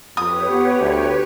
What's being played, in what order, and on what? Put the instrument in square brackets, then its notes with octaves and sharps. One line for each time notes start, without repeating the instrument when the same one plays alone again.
[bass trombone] F2 [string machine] G4 B4 C#5 [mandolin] D#6
[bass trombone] B3
D2